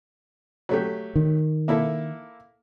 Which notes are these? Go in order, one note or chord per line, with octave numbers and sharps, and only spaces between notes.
F#3 A3 G4
D#3
A#3 E4 A4